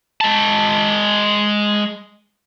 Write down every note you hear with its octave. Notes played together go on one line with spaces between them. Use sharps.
G#3 A5